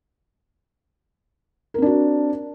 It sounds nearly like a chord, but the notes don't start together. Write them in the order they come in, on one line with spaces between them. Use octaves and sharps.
A#4 C4 D4 F#4